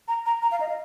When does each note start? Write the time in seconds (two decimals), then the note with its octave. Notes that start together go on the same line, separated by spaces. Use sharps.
0.08 A#5
0.26 A#5
0.42 A#5
0.51 F5
0.60 D#5
0.69 F5